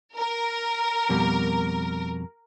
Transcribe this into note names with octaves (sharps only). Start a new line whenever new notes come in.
A#4
F2 B2 G3